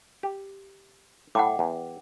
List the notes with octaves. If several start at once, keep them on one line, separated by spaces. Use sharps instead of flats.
G4
A2 E4 F#5 G5 D6
E2